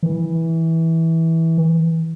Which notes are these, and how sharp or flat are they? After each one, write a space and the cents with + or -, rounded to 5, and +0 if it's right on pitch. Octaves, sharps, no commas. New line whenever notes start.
E3 -15